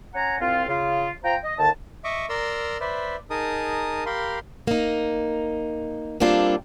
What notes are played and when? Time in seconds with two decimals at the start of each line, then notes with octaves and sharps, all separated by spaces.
0.14 C#4 F#5 G#5 A#5
0.40 C2 C4 F4
0.68 C#3 F4
1.24 F4 C5 G5 A#5
1.43 D#5
1.58 D#2 D3 A5
2.04 D#5 E5 C#6 D6
2.29 A#4 D5 A#5 C6 E6
2.81 B4 C5 D5 E5
3.30 D#4 G#4 A#4 A5 D#6
4.06 G4 A#4 F5 B5 C6
4.67 A#3 D#4
6.20 G3 A#3 C4 D4 F4 A4